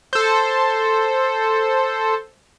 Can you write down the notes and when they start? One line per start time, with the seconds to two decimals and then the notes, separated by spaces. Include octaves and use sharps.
0.13 A4 C5